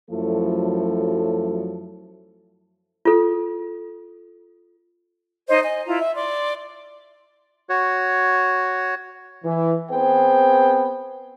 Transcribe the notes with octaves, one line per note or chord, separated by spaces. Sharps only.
F#2 F3 F#3 A3 E4 A4
F4 A4
D#4 C5 C#5 D#5
D#5 G#5
E4 F4 A#5
E5
D5 C6
F#4 C#5
E3
B3 C4 G#4 B4 C5 G5